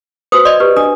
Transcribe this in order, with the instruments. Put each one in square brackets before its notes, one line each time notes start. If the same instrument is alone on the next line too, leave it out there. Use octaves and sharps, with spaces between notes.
[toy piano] F#4 C5 D#6 [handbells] B4
[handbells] D5 D#5 [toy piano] C6
[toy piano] G4 B4
[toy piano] D4 [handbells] D#6